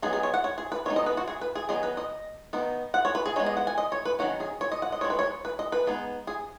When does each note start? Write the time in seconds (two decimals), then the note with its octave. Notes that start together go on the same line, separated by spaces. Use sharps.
0.02 F#3 B3 D#4 G#4
0.13 G#4
0.23 C#5
0.34 F#5
0.44 C#5
0.58 G#4
0.72 B4
0.86 G#3 B3 D#4 C#5
0.96 D#5
1.06 B4
1.17 F#4
1.28 G#4
1.41 B4
1.55 G#4
1.69 D#3 F#3 B3 D#4 G#4
1.83 B4
1.97 D#5
2.53 D#3 B3 D#4
2.94 F#5
3.05 C#5
3.15 B4
3.26 G#4
3.36 G#3 B3 D#4 C#5
3.46 D#5
3.57 F#5
3.67 G#5
3.78 D#5
3.92 C#5
4.05 B4
4.19 D#3 F#3 C#4 F#4
4.40 G#4
4.61 C#5
4.72 D#5
4.82 F#5
4.92 D#5
5.01 D#3 G#3 C#4 C#5
5.10 B4
5.19 C#5
5.45 B4
5.59 D#5
5.72 B4
5.87 G#3 B3 D#4
6.27 G#4